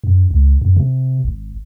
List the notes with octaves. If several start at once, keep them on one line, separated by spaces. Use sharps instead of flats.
F#2
C#2
F#2
C3
G#1